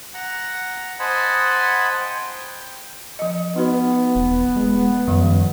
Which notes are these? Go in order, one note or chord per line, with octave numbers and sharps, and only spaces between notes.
F#5 A#5
C5 D#5 F#5 G#5 A5 B5
G5
F3 D#5
B3 D#4 F#4 B4
E1
G#3
F#2 D#3 F3 G3